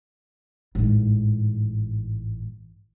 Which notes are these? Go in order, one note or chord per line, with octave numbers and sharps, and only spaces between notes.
A1 G#2